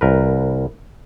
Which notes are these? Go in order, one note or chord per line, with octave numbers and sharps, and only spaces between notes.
C2 A#4 B4